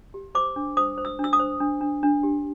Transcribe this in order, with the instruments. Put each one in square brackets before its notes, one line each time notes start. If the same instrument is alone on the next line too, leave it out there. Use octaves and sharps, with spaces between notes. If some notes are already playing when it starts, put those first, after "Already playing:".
[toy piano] G4
C5 D6
D4
C5 D#6
C5
E6
D4 E6
D#6
C5
D4
D4
D4
G4